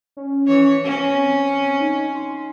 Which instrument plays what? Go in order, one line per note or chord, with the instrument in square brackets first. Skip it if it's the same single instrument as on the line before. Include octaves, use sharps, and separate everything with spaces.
[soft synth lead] C#4
[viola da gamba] E3 C#5
[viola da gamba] C#4 [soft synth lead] A#6
[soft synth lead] C4
D#4
C6